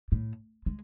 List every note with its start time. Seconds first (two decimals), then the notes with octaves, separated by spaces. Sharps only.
0.12 A2
0.66 G#3